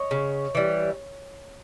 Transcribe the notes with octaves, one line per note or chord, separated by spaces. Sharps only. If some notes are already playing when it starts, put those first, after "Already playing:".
Already playing: C#5 D#5
C#3
E3 G3